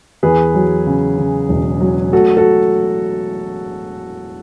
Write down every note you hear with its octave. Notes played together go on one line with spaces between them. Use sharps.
E2 G#4 B4
F#3
C#3
C#3
E1
F#3
A3 F#4 A4
F#4 A4